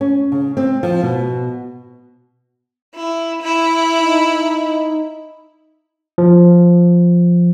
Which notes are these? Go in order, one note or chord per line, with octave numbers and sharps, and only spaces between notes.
C#4
C#3
C4
F3
B2
E4
E4
D#4
F3